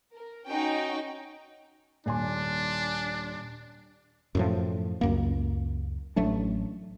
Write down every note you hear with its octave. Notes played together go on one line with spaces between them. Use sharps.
A#4
C#4 D#4 F#4 G5
D#1 D4 G#5 C6
F#2 A2 F3
C#2 F#2 A#3
A1 F#3 A3 D4